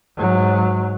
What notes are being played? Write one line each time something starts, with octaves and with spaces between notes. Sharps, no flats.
G#2 F#3